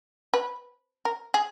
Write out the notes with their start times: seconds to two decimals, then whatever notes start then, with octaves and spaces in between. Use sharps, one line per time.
0.34 B4
1.05 A#4
1.34 G#4